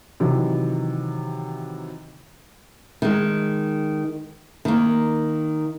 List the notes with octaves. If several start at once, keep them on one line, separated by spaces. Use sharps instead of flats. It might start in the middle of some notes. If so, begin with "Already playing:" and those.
C3 D#3 E3 F#3
D#3 G#3
D#3 A#3